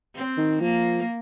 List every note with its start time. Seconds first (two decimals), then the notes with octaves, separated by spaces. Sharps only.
0.16 C4
0.38 D#3
0.61 F3 A#3